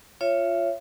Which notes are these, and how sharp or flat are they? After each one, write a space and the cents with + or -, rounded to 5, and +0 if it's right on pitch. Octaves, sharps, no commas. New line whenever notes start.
F4 +0 C#5 +0 E5 +35